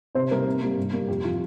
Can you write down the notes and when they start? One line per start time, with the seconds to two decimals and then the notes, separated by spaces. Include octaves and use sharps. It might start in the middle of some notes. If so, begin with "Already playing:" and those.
0.15 C3 C5
0.30 G3 A#3 A#4
0.46 C3
0.62 G3 A#3
0.77 G2
0.93 G3 A#3
1.08 F2 G4
1.24 C3 F3 F4